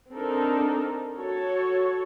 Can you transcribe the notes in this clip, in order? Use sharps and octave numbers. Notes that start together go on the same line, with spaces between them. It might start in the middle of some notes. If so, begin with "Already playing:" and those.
C4 D4 D#4 A4 A#4
F#4 A4 C#5